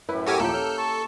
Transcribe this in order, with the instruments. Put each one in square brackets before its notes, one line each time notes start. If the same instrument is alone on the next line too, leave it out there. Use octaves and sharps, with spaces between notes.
[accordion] F#2 A2 [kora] E4 [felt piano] B4
[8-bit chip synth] F#4 G4 G#5 [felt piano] A4 A#4 C#6
[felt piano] D#2 A#2 F3 [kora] A#3 G4 [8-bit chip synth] A4
[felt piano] C#4 [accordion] F6 G6
[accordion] A5 C#6